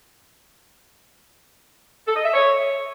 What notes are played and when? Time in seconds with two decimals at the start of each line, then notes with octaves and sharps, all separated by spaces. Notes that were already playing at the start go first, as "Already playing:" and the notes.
2.07 A4
2.16 D#5
2.25 E5
2.34 C#5